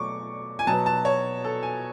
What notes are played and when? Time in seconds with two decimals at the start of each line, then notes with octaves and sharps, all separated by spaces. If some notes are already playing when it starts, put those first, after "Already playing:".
Already playing: B2 F#3 A3 C#6 D6
0.59 G#5
0.67 B2 F#3 B3 A5
0.86 A5
1.05 C#5
1.45 A4
1.63 G#5